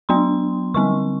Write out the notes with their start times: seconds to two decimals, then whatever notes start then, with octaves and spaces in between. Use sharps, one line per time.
0.09 F#3 B3 D4 C6
0.74 D3 G3 C4 C#6